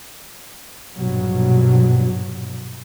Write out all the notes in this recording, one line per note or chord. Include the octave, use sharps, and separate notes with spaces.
A#1 G2 B2 F#3